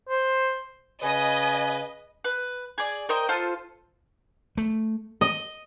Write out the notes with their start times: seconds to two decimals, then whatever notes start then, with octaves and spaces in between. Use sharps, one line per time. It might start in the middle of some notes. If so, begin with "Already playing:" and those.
0.09 C5
1.03 C#3 B4 D#5 G#5
2.24 B4
2.78 G#4 D5
3.09 A#4 C5 D#5 G5
3.29 F4 A4 C5
4.57 A3
5.21 D#5